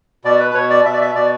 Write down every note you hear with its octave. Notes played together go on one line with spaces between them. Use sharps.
B2 D5
B4
B4
B2 C#5
D5
B2 E5
D5
E5
B2 D5